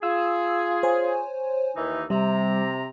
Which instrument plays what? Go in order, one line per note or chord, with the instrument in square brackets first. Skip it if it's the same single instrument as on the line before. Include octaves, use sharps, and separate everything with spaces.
[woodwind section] F4 G#4 [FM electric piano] E6
[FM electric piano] C5 C#5 G#5
[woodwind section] D#2 E3 D#4
[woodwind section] C3 A#5 [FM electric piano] G3